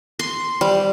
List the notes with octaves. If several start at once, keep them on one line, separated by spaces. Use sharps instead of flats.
C6
G3